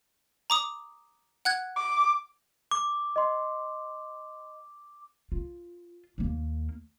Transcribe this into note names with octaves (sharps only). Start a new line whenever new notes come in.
A#5 D6 D#6
F#5 F#6 G#6
D6
D6
D#5 C6
F4
D#2 A#3